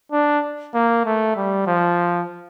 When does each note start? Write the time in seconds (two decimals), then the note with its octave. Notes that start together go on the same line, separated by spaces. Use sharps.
0.12 D4
0.74 A#3
1.05 A3
1.36 G3
1.67 F3